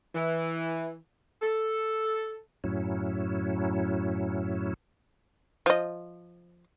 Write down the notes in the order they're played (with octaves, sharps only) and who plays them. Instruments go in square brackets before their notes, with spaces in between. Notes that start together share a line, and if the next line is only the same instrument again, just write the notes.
[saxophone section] E3
A4
[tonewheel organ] F#2 A2 F#3 C#4 E4
[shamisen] F3 D#5